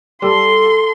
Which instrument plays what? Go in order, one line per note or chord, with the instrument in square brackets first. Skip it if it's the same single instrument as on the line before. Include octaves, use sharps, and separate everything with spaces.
[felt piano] G3 [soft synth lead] A4 [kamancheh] C6